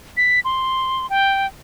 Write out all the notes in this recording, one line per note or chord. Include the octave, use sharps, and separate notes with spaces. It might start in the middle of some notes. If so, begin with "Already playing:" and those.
B6
C6
G5